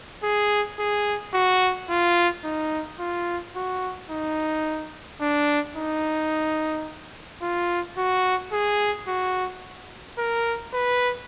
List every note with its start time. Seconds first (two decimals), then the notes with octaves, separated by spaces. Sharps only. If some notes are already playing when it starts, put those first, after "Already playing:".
0.24 G#4
0.79 G#4
1.34 F#4
1.90 F4
2.44 D#4
3.00 F4
3.56 F#4
4.10 D#4
5.21 D4
5.76 D#4
7.42 F4
7.98 F#4
8.53 G#4
9.08 F#4
10.18 A#4
10.73 B4